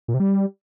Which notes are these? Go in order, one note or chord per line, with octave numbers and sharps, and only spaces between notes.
A#2
C3
G3